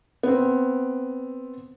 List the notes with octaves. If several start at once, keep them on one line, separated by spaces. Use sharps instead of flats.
B3 C4